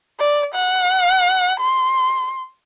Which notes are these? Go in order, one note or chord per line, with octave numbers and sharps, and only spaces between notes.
D5
F#5
C6